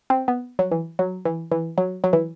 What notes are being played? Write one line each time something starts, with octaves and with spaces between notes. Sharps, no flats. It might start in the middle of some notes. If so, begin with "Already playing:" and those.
C4
B3
F#3
E3
F#3
E3
E3
F#3
F#3
E3